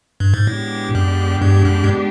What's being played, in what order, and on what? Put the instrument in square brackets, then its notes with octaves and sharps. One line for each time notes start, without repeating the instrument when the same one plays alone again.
[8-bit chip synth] G2
G#2
[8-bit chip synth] A2 [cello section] G#3 B3 D4 G4
[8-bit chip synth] F#2
G2
F#2
G2